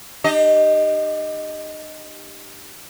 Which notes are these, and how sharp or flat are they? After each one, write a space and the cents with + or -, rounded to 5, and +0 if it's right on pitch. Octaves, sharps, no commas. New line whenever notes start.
D4 +45 G4 +0 D#5 +0